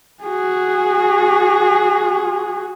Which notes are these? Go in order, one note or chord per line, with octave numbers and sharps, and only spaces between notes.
F#4 G#4